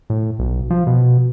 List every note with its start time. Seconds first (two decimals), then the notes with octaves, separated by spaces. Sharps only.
0.10 A2
0.39 B1
0.70 F3
0.87 B2